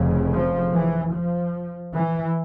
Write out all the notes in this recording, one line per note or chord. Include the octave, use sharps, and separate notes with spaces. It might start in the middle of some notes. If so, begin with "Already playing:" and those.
Already playing: F1 F2 C#3
F3
E3
F3
E3